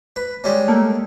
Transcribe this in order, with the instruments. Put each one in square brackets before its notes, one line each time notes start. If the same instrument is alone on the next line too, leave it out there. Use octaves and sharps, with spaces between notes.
[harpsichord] B4
G3 G#3 C#4
[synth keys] A3 A#3